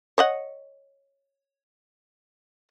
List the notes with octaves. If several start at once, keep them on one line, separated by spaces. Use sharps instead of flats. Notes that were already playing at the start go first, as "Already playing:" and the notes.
C#5 D#5 F#5